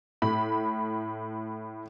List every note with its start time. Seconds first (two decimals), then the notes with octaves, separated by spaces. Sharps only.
0.22 A2 B5